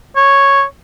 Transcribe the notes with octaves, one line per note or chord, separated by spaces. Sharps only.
C#5